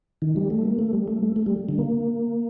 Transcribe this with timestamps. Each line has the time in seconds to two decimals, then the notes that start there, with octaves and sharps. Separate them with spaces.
0.22 D#3
0.36 G3
0.50 A3
0.65 A#3
0.79 A3
0.93 G3
1.08 A3
1.23 A3
1.36 A3
1.46 G3
1.69 D3
1.78 A#3